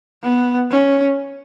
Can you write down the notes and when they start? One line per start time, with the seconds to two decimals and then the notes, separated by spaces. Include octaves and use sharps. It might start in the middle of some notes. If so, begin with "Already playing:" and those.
0.23 B3
0.71 C#4